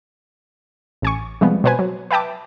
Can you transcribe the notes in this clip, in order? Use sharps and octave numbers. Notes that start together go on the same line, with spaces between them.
A1 G#5 C#6
C3 F3 G3 G#3 B3
B2 B3 B4 C5 G#5
F#3
B4 E5 G5 A5 D6